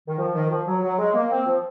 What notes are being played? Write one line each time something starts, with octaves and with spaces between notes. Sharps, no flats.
D#3
F3
D#3
F3
F#3
F#3
G#3
A#3
C4
F3